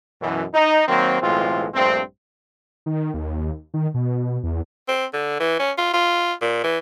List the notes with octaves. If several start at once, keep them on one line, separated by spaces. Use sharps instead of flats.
F#2 B2 E3
D#4
D#3 F#3 A#3 C4
B1 A2 E3 G#3 C4 F4
A#1 G2 A3 C4
D#3
D#2
D#3
B2
E2
C4
D3
E3
C#4
F4
F4
A#2
E3